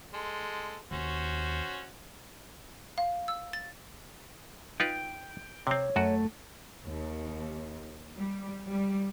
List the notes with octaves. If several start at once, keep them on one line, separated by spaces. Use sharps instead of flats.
G#3 A4 C6
D#2 C#4 F#4 C5
F5
E6
A6
D#4 F4 B4 G5
C3 C4 C#5
F#2 A3 F#4
D#2
G3
G3